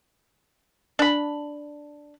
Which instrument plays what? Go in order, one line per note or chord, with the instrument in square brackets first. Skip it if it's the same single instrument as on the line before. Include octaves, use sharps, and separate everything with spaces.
[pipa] D4 B5